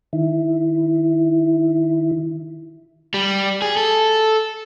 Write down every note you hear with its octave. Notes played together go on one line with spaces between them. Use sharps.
D#3 E4
G3
G#4
A4